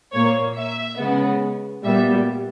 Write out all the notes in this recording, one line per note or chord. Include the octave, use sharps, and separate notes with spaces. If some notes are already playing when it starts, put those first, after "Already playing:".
A#2 A#3 C#5
E5
C#3 G#3 B3
A#2 G3 B3 E5